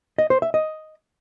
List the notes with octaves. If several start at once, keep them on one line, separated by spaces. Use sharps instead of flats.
D#5
C5
E5
D#5